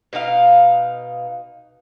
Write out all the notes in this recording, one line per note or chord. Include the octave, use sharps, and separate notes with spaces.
B2 D#4 F#4 F5